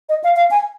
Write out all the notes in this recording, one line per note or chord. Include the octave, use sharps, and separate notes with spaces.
D#5
F5
F5
G#5